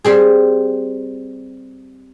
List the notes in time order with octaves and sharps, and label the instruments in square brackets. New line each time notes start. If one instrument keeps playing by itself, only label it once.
[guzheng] G3 C4 G#4